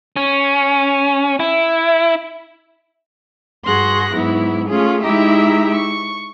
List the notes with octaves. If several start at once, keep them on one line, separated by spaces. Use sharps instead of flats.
C#4
E4
G2 F#4 G#4 C6 F#6 A#6
G#2 F#3 B3 E4
A3 C#4 F4 G#4
G#3 D#4 E4 G4 E5 A#5
C#6